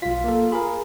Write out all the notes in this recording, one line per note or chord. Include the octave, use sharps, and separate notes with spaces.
B1 F4 B6
A#3 A4
G#4 A#4 B5